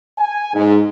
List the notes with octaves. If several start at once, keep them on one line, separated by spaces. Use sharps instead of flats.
G#5
G#2